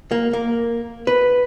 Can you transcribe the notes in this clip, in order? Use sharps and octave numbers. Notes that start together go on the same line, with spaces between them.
A#3
A#3
B4